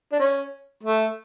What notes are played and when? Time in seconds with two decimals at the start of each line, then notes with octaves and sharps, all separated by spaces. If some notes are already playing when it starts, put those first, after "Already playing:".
0.12 D4
0.19 C#4
0.83 A3